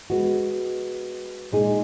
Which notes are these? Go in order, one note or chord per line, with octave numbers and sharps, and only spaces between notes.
G#3 B3 F#4
A#2 G#3 D#4 G#4